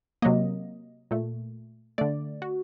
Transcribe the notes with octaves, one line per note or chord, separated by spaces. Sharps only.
C3 F#3 A#3 D#5
A#2 A3
D3 A3 D5
F#4